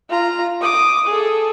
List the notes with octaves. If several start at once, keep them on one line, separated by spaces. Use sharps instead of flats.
F4 A#5
D6 D#6
G#4 A4